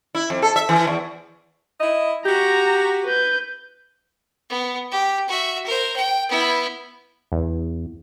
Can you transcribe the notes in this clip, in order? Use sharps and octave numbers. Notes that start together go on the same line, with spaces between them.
E4
F2
A4
E5
E3
E2
E4 D#5
F#4 G4 A#5
B4 G6
B3
G4
F#4 E5
A#4 C5
G5
B3 E4
E2